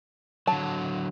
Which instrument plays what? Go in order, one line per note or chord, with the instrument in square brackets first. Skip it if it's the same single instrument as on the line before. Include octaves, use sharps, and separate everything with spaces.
[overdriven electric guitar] D3 F#3 [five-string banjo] A5